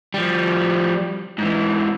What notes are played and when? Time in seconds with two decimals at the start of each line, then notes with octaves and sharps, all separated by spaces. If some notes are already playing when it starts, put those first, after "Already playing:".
0.14 F3 G3
1.39 G#2 E3